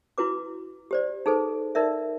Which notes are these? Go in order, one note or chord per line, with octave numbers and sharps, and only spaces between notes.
E4 F#4 B4 D6
G4 C5 D5
D#4 G#4 A4 B4 C5
D#4 A#4 D5 E5